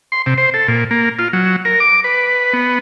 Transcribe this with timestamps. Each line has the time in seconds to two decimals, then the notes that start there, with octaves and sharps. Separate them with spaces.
0.12 C6
0.26 C3
0.38 C5
0.54 A4
0.68 A#2
0.91 A#3
1.19 F4
1.33 F#3
1.65 A#4
1.80 D6
2.04 B4
2.53 B3